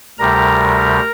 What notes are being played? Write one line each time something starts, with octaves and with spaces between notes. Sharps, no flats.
D2 C3 G3 A#4 A#5